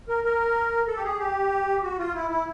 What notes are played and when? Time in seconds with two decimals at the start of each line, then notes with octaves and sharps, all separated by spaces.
0.08 A#4
0.24 A#4
0.87 A4
0.96 G4
1.04 G#4
1.19 G4
1.83 F#4
1.99 F4
2.15 E4
2.30 E4